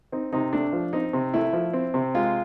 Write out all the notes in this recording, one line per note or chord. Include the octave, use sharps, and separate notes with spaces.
C4 D#4
C3 D#4
A3 D4
F3
C4 D#4
C3
A3 E4
F3
C4
C3
G#3 F4